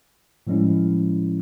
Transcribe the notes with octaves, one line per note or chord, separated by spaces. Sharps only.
A2 F3 G3 G#3 C#4 E4